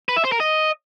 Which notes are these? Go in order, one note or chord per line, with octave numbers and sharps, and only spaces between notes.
B4
E5
C5
A#4
D#5